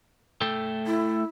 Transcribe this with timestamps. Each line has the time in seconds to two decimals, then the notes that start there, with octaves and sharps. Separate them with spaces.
0.41 A3 A4 G5
0.86 E4